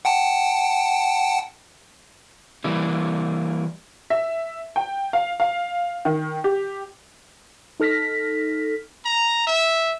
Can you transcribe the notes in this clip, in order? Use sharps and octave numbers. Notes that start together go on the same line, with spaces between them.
F#5 G5 A5
E3 G3 A#3 E4 G4
E5
G5
F5
F5
D#3
G4
D#4 A4 F6 A#6 B6
A#5
E5